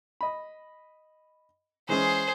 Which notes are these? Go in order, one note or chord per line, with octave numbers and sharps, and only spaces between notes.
D#5 B5
E3 G#3 C#4 G#4 C5